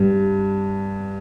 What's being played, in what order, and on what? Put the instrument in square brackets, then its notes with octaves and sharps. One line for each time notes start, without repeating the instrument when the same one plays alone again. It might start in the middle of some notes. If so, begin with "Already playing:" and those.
Already playing: [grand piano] G2